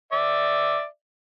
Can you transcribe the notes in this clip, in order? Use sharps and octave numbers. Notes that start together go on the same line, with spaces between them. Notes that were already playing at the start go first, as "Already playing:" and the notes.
D5 E5